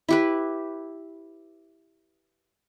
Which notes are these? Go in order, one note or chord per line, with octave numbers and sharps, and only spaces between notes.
E4 G4 B4